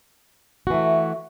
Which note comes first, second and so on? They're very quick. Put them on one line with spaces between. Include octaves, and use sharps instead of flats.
F#4 E3 A3